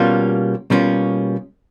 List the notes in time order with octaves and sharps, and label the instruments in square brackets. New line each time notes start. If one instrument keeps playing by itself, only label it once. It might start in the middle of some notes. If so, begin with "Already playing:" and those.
Already playing: [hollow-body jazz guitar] B2 G3 A#3 C#4 F4
B2 G3 A#3 C#4 F4